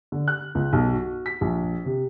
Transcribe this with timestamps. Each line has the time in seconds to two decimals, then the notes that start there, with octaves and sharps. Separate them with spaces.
0.12 D3
0.28 F#6
0.55 C#2
0.73 B1
0.94 F#4
1.26 B6
1.41 A#1
1.85 C3